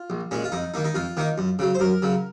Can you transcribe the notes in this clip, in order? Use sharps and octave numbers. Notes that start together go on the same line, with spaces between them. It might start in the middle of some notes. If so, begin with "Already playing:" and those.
Already playing: F4
A#1
A#2 G#3 C#4
F4
F2 D#4
D#3 A#3 D#4
D#4
F2 F4
D#3 A#3 D#4
F#2
C#3 F#3
C5
F#2 A#4
C#3 F#3